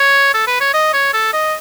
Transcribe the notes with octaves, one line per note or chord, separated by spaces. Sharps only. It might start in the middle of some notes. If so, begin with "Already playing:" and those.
Already playing: C#5
A4
B4
C#5
D#5
C#5
A4
D#5